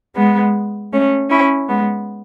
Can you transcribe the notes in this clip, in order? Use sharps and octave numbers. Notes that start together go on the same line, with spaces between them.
G#3 B3
A3 C#4
C#4 E4
G#3 B3